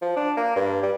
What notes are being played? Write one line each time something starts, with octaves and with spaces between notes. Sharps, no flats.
F3
D4
A#3
G2
G3